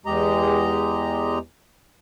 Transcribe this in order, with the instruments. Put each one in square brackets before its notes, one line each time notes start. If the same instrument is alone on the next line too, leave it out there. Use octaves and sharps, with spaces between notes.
[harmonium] E2 G#3 G4 D#5 A#5